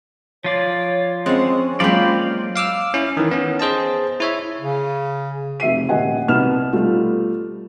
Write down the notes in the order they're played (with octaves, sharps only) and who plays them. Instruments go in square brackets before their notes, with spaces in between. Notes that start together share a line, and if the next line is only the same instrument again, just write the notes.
[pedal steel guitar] F3 F4 D5 [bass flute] C#5
[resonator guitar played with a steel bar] G#3 [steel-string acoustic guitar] C4 F#5 [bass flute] C#4
[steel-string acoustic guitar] F#3 G#3 A#3 [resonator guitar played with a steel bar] C4 F4 [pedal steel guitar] D5 F5 B5
[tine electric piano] F5 D6 E6 F6
C#4 E4
D#3 E3
B3 C#4
G#4 C5 D#5 A5
E4 C#5 E5
[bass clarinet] C#3
[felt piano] F1 E5 C7 D#7
D#1 D#5 F#5 G#5
C2 B2 B3 D#4 F6 E7
G3 A3 F4